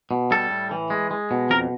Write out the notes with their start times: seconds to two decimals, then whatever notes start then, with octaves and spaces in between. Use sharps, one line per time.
0.11 B2
0.31 G3 A4
0.51 A2
0.71 E3
0.90 G#3
1.11 G#3
1.31 B2
1.50 F2 A#4